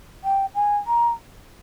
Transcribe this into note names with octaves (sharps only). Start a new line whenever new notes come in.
G5
G#5
A#5